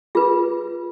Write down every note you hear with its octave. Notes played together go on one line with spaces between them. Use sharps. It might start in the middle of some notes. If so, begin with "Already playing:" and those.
F4 G#4 B4